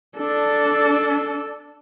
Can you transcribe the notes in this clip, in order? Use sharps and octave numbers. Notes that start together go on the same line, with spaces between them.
D4 A4